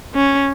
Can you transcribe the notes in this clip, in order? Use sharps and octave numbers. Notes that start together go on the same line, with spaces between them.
C#4